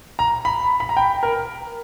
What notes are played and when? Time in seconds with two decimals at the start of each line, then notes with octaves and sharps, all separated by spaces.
0.19 A#5
0.45 B5
0.80 B5
0.89 A#5
0.97 G5
1.23 A#4